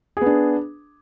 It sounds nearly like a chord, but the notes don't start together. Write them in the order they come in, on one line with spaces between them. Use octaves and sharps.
G#4 B3 D4